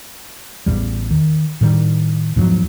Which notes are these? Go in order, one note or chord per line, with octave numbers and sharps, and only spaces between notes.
A1 E2 G3
D#3
A2 D#3 G3
E2 G#2 F3 F#3